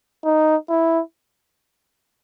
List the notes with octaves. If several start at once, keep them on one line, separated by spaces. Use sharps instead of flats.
D#4
E4